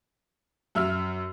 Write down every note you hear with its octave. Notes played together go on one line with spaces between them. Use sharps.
F#2 E5 E6 F6